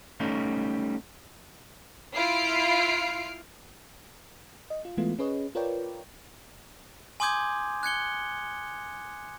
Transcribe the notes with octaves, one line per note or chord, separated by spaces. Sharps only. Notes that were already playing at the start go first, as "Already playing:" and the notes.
G3 A3 C#4 D#4
E4 F4 F6 C7 D7
D#5
F4
E3 G#3 A3 B3 F4
C#4 G#4 B4 C#5 D#5
F4 A#4 B4 C#5 D5 G5
G#5 C6 D6 D#6 G6 G#6
F#6 G#6 C#7 G7